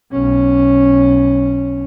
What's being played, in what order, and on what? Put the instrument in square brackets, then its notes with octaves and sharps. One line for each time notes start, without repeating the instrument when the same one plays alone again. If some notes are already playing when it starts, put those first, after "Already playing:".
[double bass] B1 C#4